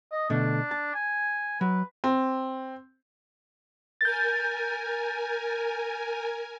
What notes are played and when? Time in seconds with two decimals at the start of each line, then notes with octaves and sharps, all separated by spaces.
0.12 D#5
0.30 B2 D3 A3 D4
0.71 A5
0.94 G#5
1.61 F#3 B4
2.04 C4
4.01 A#4 G#5 G6 A6